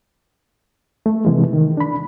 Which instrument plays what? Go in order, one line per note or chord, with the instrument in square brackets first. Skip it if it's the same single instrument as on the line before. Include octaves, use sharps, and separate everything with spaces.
[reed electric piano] A3
C3 E3 G#3
D#3
D4 B5